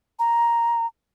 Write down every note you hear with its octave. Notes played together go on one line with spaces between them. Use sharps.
A#5